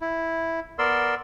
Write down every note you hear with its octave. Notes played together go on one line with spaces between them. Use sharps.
E4
B3 A#4 D5 C6 E6